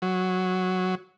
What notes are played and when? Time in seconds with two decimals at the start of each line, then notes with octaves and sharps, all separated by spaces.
0.02 F#3